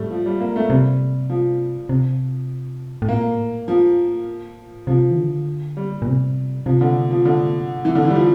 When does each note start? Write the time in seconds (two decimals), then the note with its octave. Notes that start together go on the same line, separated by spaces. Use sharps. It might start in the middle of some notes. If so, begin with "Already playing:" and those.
Already playing: A2 G3 A3
0.11 F3
0.26 G3
0.40 A#3
0.56 A3
0.70 C3 G3
1.30 F3
1.89 C3
3.02 A2
3.08 A#2 A#3
3.38 A2
3.68 F3
4.87 C3 F3
5.11 E3
5.18 D3
5.77 G3
6.02 A#2
6.07 C3
6.66 C3 F3
6.81 D3
7.11 F3
7.25 D3
7.85 E3
7.95 D3
8.05 E3
8.10 G3
8.15 F3